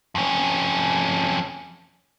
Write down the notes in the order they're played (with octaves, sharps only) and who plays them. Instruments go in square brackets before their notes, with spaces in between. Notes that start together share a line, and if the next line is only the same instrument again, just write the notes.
[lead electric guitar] F2 C#4